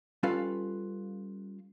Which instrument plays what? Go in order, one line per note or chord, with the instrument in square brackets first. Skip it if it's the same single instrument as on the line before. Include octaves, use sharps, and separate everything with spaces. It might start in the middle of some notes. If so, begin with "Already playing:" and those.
[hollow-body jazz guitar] G3 C#4 F4 A4 B4 F5